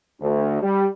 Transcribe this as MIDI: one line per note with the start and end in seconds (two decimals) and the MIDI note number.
0.21 0.58 38
0.62 0.86 55